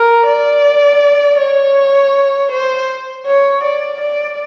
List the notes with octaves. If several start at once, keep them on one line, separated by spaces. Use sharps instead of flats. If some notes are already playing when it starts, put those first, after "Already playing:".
Already playing: A#4
D5
C#5
C5
C#5
D5
D5